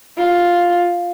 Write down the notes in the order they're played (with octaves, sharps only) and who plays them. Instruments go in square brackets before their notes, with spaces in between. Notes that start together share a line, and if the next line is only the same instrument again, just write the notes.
[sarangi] F4